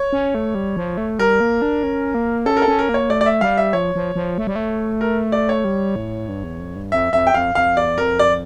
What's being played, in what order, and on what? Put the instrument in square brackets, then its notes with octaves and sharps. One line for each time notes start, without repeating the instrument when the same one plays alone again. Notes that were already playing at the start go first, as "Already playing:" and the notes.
Already playing: [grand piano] C#5
[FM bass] C#4
A3
G3
F3
A3
[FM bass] G3 [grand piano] A#4
[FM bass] A#3
D4
C#4
A#3
[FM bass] C#4 [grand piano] A4
[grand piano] A#4
A4
[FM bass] C#4
[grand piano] A#4
[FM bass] A#3
[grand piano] C#5
[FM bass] A3 [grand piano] D5
[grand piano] D5
E5
[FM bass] G3 [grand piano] F5
[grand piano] E5
[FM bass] F3 [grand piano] C#5
[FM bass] F3
F3
A3
G3
A3
[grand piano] A#4
D5
C#5
[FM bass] G3
A2
G2
E2
F2
G2
[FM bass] F2 [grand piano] E5
[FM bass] F2 [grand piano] E5
[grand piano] G5
[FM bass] F2 [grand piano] F5
[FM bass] F2 [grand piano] F5
[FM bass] E2 [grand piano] D5
[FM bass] F2 [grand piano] A#4
[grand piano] D5